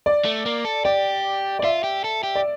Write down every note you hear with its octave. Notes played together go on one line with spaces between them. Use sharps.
D5
A3
A#3
A4
G4 D5
D5
F4 E5
G4
A4
G4
D5